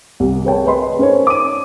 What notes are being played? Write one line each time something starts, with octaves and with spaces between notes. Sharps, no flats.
C2 C3
G#4 A#4 B4 C#5 G5 A5
G#4 B4 D#5 B5 C6
C#4 D#4 A#4 C5 C#5
D6 D#7